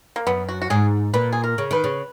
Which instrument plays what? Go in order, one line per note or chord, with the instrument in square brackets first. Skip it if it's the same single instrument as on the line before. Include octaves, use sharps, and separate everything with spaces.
[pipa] A#3
[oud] F#2 [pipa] B3
[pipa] F#4
F#4
[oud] G#2 [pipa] G#4
[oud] A#2 [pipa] B4
[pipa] G#4
A#4
[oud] C#3
[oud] D#3 [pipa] B4
[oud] C#3